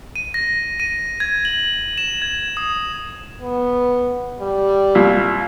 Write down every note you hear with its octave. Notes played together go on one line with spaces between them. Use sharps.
D#7
A#6
D#7
G#6
F#7
E7
G#6
D#6
B3
G3
C2 A#2